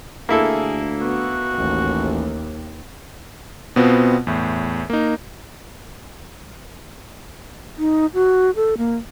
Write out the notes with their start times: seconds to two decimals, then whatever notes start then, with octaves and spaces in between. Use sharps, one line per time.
0.29 D2 A#3 E4 G#4 A4
1.00 B3 F#4
1.58 A1 D#2
3.76 B2 B3 C4 F4
4.27 E2 A2
4.90 A#3 D#4
7.78 D#4
8.14 F#4
8.56 A4
8.78 A#3